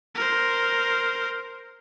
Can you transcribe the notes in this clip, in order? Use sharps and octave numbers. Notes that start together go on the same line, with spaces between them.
A#4 C5